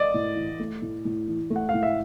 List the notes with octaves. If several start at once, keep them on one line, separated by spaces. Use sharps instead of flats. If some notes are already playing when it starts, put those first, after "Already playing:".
Already playing: D5 D#5
A2
E3
A3
A2
A2
E3
A3
F#5
A2 F5
E5